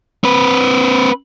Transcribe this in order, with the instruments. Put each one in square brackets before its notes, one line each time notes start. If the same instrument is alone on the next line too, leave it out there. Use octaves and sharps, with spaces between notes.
[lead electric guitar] C4 B4